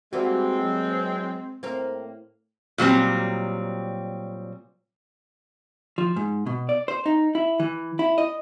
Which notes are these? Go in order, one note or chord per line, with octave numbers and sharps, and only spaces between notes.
E3 G3 G#3 A#3 C4 F#4
F#3
A2 A#3 C4 A#4
A#2 F#3 G3 C4
F3
G#2
B2
D5
C5
D#4
E4
E3
E4
D#5